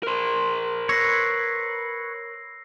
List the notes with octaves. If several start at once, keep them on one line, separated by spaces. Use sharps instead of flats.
A#4 C5
B4 C#5 E6 A#6 C7